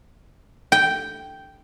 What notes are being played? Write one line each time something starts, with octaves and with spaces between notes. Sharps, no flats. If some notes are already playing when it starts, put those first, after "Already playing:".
G5